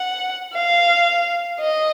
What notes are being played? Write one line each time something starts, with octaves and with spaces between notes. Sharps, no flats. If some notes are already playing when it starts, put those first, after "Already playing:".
Already playing: F#5
F5
D#5